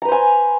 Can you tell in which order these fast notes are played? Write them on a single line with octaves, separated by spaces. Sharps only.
A#5 B4 C5 G#5